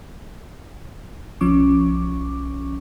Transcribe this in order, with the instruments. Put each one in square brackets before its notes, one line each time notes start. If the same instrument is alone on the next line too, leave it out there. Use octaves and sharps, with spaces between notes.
[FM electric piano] B1 F3 C#4 C#6 D6